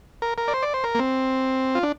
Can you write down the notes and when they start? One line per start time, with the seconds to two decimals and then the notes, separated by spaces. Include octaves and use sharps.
0.22 A#4
0.38 A#4
0.48 D5
0.54 C5
0.63 D5
0.74 C5
0.84 A#4
0.95 A#3
0.99 C4
1.75 F4
1.83 D4